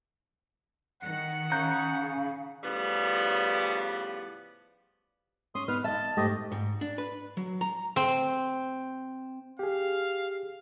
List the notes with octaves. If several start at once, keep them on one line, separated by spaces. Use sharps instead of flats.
D#3 F#5 C#7
C#3 A#5 F#6 G6
A2 C#3 F3 G3 B3
C#4 C6 D#6
B3 D#4 B4 F6
D#5 E5 A5
G#2 A3 G4 D#5
G#2
D4
B4
F#3
A#5
C4
G4 G#4 F5